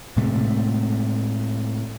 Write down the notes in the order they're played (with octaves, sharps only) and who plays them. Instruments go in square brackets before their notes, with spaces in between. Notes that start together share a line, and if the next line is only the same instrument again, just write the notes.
[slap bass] A2 C3 G#3 A3